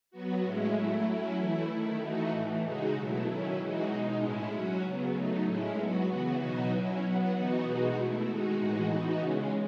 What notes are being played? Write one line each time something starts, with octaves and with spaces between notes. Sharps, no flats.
F#3 B3 F#4
A2 G#3 C#4 E4
F#3 A3 E4
F#3 C#4 E4
E3 A3 E4
D#3 A3 E4
E3 A3 D#4 F#4
A2 E3 A3
C#3 G#3 D#4 F#4
B2 F#3 A3 E4
D#3 F#3 C#4 E4
E3 G#3 D#4 F#4
B2 G#3 D#4
A2 G#3 C#4 E4
F#3 C#4 F#4
C#3 F#3 B3
F#3 A3 D#4
A2 G#3 C#4 E4
F#3 B3 F#4
C#3 E3 B3 F#4
B2 F#3 B3 D#4 F#4
F#3 C#4 E4
F#3 B3 F#4
E3 B3 D#4 F#4
B2 G#3 D#4 F#4
B2 A3 E4
D#3 G#3 D#4 F#4
A2 E3 G#3 D#4 F#4
E3 B3 D#4 F#4
C#3 G#3 C#4